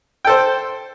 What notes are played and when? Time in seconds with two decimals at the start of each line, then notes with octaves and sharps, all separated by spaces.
0.25 G5
0.27 A4
0.30 C5